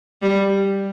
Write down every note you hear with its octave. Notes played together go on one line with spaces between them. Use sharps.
G3